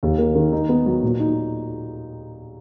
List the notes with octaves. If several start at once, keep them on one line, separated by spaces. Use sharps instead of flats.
D#2
A#3
D#3
D#4
B3
F#3
A#2
D#4